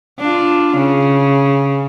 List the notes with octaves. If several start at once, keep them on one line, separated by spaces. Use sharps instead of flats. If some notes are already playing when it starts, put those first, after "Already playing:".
D4 F4
C#3